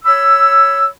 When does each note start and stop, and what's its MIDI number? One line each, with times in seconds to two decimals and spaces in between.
0.04 0.86 73
0.04 0.86 83
0.04 0.86 88